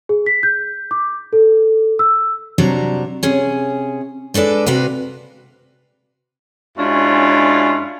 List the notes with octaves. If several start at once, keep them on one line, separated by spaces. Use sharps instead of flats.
G#4
B6
G6
D6
A4
E6
C3 F#3 G3 D4 A#5
C3 C#4 G#4
G#3 D4 A4 B4 D5
C3 F#4 B4 D5 F5
F#2 G#3 C#4 D4 E4 F4